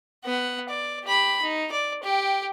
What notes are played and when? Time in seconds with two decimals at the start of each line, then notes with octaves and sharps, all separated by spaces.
0.25 B3 F#5
0.69 D5
1.04 G4 B5
1.43 D#4
1.72 D5
2.03 G4 G5